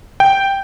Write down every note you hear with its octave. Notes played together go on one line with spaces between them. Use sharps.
G5